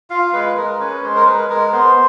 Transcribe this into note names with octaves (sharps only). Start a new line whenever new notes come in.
F4 F5
G#3 B4
G#3 A#4
C#4 B4
G#3 C5
A#4
G#3 B4
G#3 A#4
B3 C5